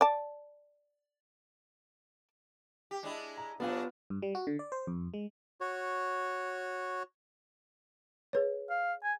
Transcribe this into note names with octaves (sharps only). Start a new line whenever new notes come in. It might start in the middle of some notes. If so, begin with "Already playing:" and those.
D5 A5
G4
G#3 D4 E4
A#5
C3 F#3 B3 D4 F4 F5
G2
G3
F#4
D3
D5
C5
F2
G#3
F#4 C#5
G#4 B4 C#5
F5
G#5